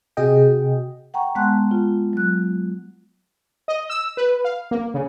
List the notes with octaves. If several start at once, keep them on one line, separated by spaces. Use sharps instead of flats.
C3 F#4 G#4 D#5 G5
F#5 G5 A#5 C#6
G#3 B3 F#5 A5 C6 F#6
F4
F#3 F#6
D#5
E6
B4
F5
A#3
C#3